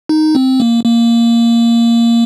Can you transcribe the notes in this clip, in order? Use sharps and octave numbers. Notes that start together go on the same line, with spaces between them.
D#4
C4
A#3
A#3